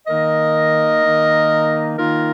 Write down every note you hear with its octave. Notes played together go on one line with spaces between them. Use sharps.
D#3 A#3 D#4 A#4 D#5
D#3 A#3 D#4
D#3 A#3 D#4 F4 A#4